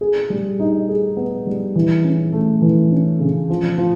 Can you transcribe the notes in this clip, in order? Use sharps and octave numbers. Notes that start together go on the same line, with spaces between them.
G#4
G3
D#4
G#4
B3
G3
E3
C#4
A3
E3
C#4
C#3
F3
F3